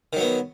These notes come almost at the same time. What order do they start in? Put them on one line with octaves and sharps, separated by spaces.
D#3 F#3 B3